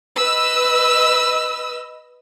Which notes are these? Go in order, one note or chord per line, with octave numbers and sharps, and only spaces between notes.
B4 D#5 E6